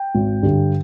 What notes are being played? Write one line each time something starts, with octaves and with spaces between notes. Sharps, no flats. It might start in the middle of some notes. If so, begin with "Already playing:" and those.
Already playing: G5
G#1
G2 D3 G3